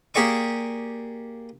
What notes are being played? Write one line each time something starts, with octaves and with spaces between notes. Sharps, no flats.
A#3 G4 G#4 D5 C#6 D6